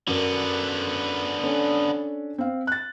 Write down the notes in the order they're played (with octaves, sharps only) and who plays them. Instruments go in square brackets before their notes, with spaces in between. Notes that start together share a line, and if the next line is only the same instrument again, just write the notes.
[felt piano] F#2 A#4 [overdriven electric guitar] D3 B3
[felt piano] C#4 D4 A4
C4 F5
F#6 A6